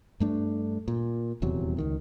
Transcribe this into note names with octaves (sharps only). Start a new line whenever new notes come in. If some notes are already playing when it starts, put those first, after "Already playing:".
G2 A3 D4
A#2
D#1 E2 C3 F#3
C#2 D#3